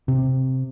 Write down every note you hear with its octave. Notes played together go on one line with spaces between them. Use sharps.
C3